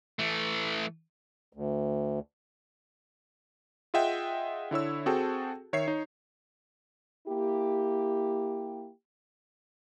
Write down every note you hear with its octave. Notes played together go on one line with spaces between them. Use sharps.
E3 A3
D2
F4 G#4 D#5 E5 F#5 G5
D3 E4 C#5 E6
C4 F#4 G#4 A4 G5 A5
D#3 C#5 E5 C7
D#4 C#5
A#3 E4 G4